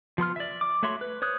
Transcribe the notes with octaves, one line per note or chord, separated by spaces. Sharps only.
F3 B3 C6 F6
D5 E5
D6
A3 F#4 C#5 E5 C6
B4
C5 C#5 D#6 F#6